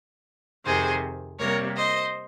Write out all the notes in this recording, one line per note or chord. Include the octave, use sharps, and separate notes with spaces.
F2 C3 D#3 G#4 C5
C3 G3 A#3 A#4 C#5
C5 D#5